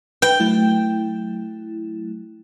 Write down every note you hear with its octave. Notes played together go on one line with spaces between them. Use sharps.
B4 G5
F#3 A3 E4